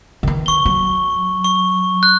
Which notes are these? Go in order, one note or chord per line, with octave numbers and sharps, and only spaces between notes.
D#3 E3
C#6 G7
F#3
C#6
F#6